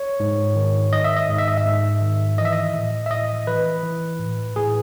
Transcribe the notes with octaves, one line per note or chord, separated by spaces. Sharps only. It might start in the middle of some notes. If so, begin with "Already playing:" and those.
Already playing: C#5
G#2
D#3
D#3 D#5
E5
D#5
G#2
E5
D#5
E5
G#2
D#3
E3 D#5
E5
D#5
A2
E5
A2 D#5
E3 B4
E3
A2
A2 G#4